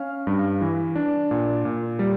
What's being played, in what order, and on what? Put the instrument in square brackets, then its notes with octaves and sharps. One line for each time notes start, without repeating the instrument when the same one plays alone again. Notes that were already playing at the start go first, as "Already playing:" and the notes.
Already playing: [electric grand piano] C#4 F5 F6
G2
E3
D4
A#2
A#2
G3